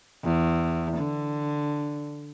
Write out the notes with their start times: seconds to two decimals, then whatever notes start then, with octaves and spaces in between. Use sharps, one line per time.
0.24 E2
0.98 D3